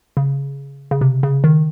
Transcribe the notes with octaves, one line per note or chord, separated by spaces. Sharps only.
C#3
C#3
C3
C#3
D#3